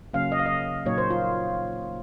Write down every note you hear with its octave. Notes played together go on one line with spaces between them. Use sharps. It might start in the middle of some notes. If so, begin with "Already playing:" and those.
C#3 F#3 A#3 C#4 F5
D#5
F5
D#5
A#2 F#3 A#3 D#4 C#5
C5
F4